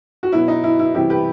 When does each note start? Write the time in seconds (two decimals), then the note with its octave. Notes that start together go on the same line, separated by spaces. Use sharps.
0.23 F#4
0.32 B2 F#3 E4
0.48 D#4
0.64 E4
0.79 E4
0.95 C3 E3 G3 E4 G4
1.10 G4 B4